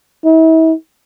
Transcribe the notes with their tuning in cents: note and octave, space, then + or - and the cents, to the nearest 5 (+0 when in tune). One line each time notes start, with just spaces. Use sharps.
E4 -40